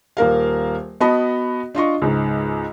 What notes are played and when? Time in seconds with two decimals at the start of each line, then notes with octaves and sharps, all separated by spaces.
0.17 D#1 A#3 A#4 F5
1.00 B3 F#4 D#5 A5 B5
1.75 D4 F4 D#5 C#6
2.02 C#2 G#2